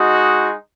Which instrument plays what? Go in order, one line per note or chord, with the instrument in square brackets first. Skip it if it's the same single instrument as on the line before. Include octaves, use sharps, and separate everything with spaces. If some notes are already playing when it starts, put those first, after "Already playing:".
Already playing: [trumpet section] G#3 D#4 F#4